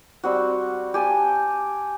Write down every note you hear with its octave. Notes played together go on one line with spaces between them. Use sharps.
G3 C4 F#4
G4 G#5 A5